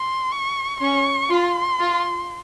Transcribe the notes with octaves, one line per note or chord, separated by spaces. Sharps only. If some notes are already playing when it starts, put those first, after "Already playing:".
Already playing: C6
C#6
C#4 C#6
F4 C6
F4